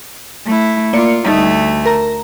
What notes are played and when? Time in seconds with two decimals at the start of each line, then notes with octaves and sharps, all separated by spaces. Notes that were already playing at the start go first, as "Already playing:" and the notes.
0.45 A3 E4
0.93 A#3 F4 D5 C#7
1.26 D2 G3 A3 D#4
1.86 A#4 A#5